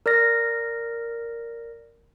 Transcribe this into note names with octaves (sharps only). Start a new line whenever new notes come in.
A#4 D5 F6 A#6